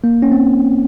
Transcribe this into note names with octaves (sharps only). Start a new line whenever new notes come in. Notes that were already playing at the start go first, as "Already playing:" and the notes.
A#3
C#4
C4